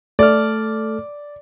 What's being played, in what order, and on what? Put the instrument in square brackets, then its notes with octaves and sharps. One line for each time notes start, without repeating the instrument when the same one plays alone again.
[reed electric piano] A3 A4 F6 [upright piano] D5